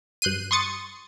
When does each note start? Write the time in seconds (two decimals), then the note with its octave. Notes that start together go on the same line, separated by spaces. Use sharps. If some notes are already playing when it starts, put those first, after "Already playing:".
0.22 G2 F#6 G6 C7 D#7
0.51 C6 C#6 D#6 A6 C#7